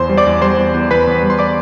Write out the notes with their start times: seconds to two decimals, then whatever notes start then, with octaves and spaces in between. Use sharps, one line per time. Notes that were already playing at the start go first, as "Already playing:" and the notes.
Already playing: E2 C5 C6
0.09 G3
0.17 D5 D6
0.27 E2
0.42 G3 C5 C6
0.58 E2
0.74 E2
0.91 E2 B4 B5
1.07 E2
1.22 G3
1.30 C6
1.39 D5 D6